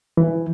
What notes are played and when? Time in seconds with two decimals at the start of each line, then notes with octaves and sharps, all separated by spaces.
0.17 E3